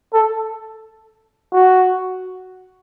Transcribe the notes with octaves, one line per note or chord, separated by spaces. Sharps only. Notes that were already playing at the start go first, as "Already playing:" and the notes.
A4
F#4